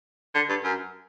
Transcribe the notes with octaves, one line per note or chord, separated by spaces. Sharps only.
D3
G2
F#2